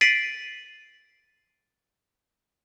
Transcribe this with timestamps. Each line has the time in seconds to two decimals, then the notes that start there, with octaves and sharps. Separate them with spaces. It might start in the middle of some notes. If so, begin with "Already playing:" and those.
0.01 A6 B6 C7 D7 D#7 F#7